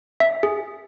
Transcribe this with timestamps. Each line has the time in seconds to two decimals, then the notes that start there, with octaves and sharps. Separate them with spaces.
0.20 E5
0.43 G#4